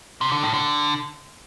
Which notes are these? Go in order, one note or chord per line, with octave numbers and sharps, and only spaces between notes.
C3
D3
A2
D3